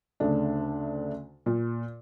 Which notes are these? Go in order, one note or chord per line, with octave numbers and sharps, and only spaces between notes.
D2 C#3 A3 D4
A#2